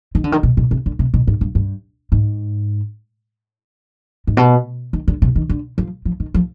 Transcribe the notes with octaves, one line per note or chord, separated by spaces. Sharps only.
D#3
D3
D#3
B2
B2
C3
D3
C3
B2
G#2
G2
G2
G#2
G#2
B2
D#3
D3
C3
D#3
D3
F3
F3
D#3
F3